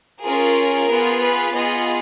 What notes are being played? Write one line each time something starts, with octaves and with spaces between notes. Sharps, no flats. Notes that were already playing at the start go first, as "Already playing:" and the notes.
C#4 F4 G#4 A#4
B3 F4 G#4
B4
B3 F4 G#4 D#5